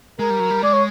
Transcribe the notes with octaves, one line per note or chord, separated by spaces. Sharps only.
G#3 A#4
G3
F#3
G3
G#3 D5
C#5